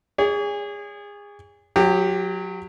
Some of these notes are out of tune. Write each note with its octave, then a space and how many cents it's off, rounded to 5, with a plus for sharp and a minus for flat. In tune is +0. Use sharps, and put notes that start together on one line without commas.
G#4 -25 C#5 +40
F#3 -20 G4 +10